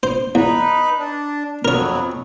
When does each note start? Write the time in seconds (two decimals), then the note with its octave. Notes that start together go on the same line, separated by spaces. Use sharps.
0.03 C5
0.35 E2 D#4 B4
0.98 D4
1.65 F2 F#3 B3 A#4 C#5